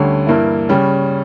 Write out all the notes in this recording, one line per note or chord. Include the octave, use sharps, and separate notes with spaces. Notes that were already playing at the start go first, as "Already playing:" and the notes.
Already playing: D2 D3 G3 C#4
G2 E3 A#3 E4
C#3 G3 C#4